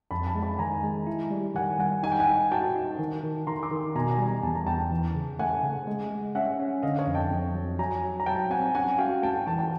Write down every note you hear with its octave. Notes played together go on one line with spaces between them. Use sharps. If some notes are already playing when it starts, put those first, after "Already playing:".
F2 A5 B5
A5 B5
G#3
A5 B5
D#3 G#5 A#5
G#3
E4
G3
D#3 F#5 G#5
G3 F#5 G#5
D#4 G#5
G5
F#5 G#5
D#4
F#4 G5 A5
D#4
D#3
D#3
D#3 A#5 C6
C6 D6
D#3
B2 G#5 A#5
G#5 A#5
G3
G#5 A#5
E2 A5
A#5
E2 G5 A5
E3
C#3
A3 F#5 G#5
C#3
G#3
G#3
C#4 E5 F#5
C#4
D3 D#5 F5
C#5 D#5
F2
G5 A5
F2
F#3
F#3 G#5 A#5
F#3
A#5
F#3 G5 A5
C4 F#5 G#5
C#4 F#5 G#5
F#4 F5 G5
A3 G5 A5
E3 G5 A5
A5